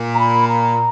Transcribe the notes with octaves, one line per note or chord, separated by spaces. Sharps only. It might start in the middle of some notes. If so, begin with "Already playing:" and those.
Already playing: A#2
A#5
B5
A#5